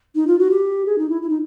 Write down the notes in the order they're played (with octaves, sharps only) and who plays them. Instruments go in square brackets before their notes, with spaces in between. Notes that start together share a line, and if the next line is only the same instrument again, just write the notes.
[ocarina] D#4
F4
F#4
G4
G#4
D#4
E4
E4
D#4